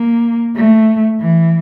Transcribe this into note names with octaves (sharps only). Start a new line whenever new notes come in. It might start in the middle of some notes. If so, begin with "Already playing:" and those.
Already playing: A#3
A3
E3